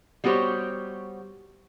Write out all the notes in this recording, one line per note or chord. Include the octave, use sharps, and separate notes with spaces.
G3 B3 F#4 G4 C5 C#5